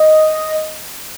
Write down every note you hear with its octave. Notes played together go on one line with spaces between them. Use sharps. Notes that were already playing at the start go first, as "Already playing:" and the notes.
Already playing: D#5